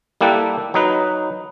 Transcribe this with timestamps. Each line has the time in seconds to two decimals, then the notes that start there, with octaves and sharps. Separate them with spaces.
0.21 G3 A#3 E4 G4 A4 F#5
0.74 F#3 D#4 B4